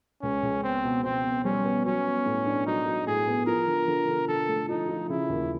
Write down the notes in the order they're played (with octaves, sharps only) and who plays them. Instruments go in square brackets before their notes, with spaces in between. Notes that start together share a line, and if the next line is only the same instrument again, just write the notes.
[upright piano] C#2 [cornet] C#4
[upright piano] C#2
[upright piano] B3 [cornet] C4
[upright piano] B2
[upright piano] B2 [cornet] C4
[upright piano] B3
[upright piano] G3 [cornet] C#4
[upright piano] B3
[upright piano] F#3 [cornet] C#4
[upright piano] B3
A2
D4
[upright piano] F#3 [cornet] D#4
[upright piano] F#3
[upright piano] A2 [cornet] G#4
[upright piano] B3
[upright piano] F3 [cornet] A#4
[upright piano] D3
D3
D3
[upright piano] D3 [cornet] A4
[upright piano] A3
[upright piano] F3 [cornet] D#4
[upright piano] F3
[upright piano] C#3 [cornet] E4
[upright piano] D#2